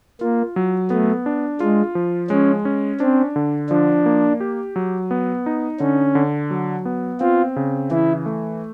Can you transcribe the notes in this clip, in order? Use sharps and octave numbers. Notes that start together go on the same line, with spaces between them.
A#3 F4
F#3
A3 B3
D4
G#3 F4
F3
G#3 C#4
C#4
C4 D4
D3
F3 D4
A#3
G4
F#3
B3
D#4
D3 C#4
D3
F#3
B3
C4 F4
C#3
E3 E4
A3